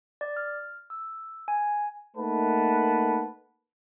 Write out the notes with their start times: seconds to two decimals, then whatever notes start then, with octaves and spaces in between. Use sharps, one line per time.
0.21 D5
0.37 F6
0.90 E6
1.48 G#5
2.17 A3 A#3 D#4 B4 F#5 A5